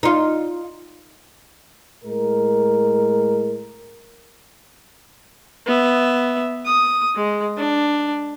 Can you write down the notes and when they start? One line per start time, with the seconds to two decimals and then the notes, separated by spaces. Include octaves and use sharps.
0.03 D#4 F4
2.04 A2 G#3 A#4
5.66 B3 E5
6.65 D#6
7.15 G#3
7.57 D4